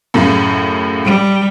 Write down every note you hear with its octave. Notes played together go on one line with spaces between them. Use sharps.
F#2 A2 C#3
G3